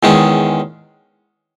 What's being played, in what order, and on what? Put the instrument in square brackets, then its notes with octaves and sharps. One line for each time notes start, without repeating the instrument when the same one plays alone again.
[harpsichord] E2 D#3 G#3 C#4